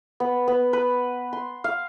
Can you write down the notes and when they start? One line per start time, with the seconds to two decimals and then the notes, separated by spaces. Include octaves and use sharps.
0.20 B3
0.48 B3
0.73 B4
1.33 C6
1.64 F5